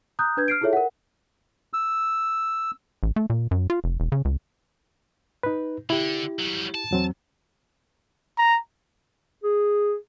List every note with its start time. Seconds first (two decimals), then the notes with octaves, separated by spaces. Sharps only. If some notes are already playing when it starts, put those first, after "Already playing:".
0.19 A#5 D#6 F#6 G6
0.37 D4 B4 G6 G#6
0.48 F6 C7 D7
0.61 E4 F4 G#4 A4 C#5 E5
0.73 A#4 F#5
1.73 E6
3.03 A1
3.16 A3
3.30 A#2
3.51 F#2
3.70 F4
3.84 F1
4.00 E1
4.12 C#3
4.25 C#2
5.43 D#4 B4
5.90 D3 E4 G4
6.39 F#3 G3
6.74 A5
6.91 E2 F#3 C4
8.38 A#5
9.44 G#4